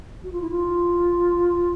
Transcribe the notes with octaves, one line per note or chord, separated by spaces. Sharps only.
F#4
F4
E4
F4